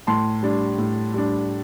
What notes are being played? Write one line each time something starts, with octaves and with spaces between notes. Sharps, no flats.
A2 A5 C6
G3 D4
A2
G3 D4